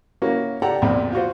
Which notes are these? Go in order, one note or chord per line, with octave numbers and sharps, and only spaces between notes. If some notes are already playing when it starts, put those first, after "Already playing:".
A#3 C#4 E4 F#4
G4 A4 D5 F#5 G5 A#5
A#1 E2 A#2 C4 D5 B5
F4 F#4 C5